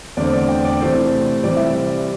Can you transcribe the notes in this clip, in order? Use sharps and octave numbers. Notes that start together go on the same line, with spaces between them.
E2 D3 A3 C4 D5
D5
G5
D5
C3 E3 A3 C4 C5
C3 E3 G3 C4 D5
E5
D5